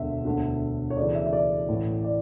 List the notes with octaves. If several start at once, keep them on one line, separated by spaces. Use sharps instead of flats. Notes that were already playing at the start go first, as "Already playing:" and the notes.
Already playing: E1 D2 D3 E5
E1 D2 D3
C#5
D2 C#3 E3 D5
E5
E5
D5
A1 A2 E3
D5